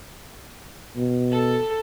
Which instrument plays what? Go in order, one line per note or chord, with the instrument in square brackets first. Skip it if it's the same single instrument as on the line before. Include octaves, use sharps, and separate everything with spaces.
[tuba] B2
[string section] A4